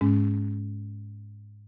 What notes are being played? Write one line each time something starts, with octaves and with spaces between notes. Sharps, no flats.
G#2 G#3 C#4